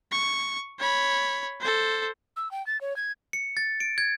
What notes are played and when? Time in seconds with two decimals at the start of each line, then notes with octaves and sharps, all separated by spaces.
0.12 C#6
0.80 C#5 B5
1.61 A4 C5
2.36 E6
2.51 G5
2.67 A6
2.81 C#5
2.96 G#6
3.33 C#7
3.57 A6
3.80 D7
3.98 G#6